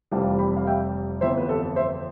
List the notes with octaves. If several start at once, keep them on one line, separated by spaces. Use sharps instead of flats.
F1 F2 E3 G3 C4 F5 A5
G5 B5
F5
E5 G5
G1 F2 E3 C5 E5
B4
A4
C5 E5